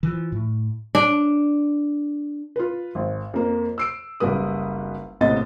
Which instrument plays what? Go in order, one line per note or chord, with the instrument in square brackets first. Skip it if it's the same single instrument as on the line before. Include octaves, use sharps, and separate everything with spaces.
[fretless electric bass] E3 F3
A2
[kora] D4
[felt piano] F4 B4
G#1
F2 A#3
E6 C7 D7
F#1 B1 B2 G3 B4 D#6
A#1 A2 C3 B3 D#5 A6